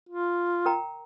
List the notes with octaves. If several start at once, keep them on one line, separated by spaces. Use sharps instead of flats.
F4
A#4 G5 A#5